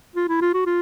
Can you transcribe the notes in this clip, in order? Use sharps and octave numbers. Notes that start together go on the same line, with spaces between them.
F4
E4
F4
F#4
F4